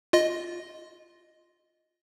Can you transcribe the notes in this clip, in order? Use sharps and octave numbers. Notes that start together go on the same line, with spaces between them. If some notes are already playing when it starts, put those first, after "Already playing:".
F4 D#5